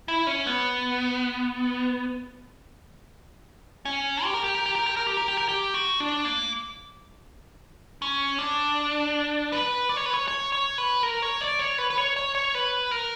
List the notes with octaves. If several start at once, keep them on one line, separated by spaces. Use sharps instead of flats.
E4
C#4
B3
C#4
G4
A#4
G4
A#4
G4
A#4
G4
A#4
G4
A#4
G4
A#4
G4
F#4
D4
A#3
C#4
D4
B4
D5
C#5
B4
C#5
C#5
C#5
B4
A#4
C#5
D5
C#5
B4
B4
C#5
C#5
C#5
B4
A#4